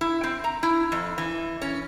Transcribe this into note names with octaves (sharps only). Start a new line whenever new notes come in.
E4
C4
A#5
E4
F2
E3
C#4